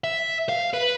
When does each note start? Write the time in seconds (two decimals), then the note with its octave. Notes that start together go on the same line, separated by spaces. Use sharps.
0.04 E5
0.49 F5
0.74 B4